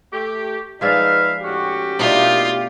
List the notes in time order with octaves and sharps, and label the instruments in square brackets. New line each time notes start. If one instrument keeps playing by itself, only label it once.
[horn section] A3 G4
[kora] F3 G#3 D5 [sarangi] D#4 [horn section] B4 E5 F5
[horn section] A2 C#4 F#4 [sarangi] G4
[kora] B2 A3 D4 [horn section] A#3 D#4 [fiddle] F4